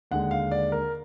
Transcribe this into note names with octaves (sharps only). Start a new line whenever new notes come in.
D#2 D3 G#3 F#5
F5
D5
A#4